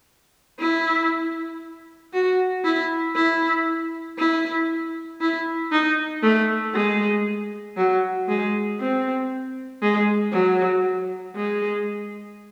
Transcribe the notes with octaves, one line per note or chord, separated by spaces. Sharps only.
E4
F#4
E4
E4
E4
E4
D#4
A3
G#3
F#3
G#3
C4
G#3
F#3
G#3